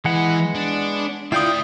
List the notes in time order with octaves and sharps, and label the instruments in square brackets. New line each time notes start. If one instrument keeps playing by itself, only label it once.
[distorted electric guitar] E3 [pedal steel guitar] G#3 B3 F#5
[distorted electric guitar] D4
[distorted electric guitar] A3 D5 [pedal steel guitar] E4 F4 G5 [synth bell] D#6 G6 C7